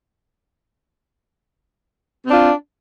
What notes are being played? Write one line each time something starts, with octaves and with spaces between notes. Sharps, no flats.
C4 D4 F4